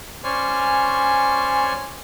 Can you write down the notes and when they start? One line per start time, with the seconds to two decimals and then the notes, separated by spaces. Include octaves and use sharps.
0.24 C#4 C5 D5 G#5 C#6 F6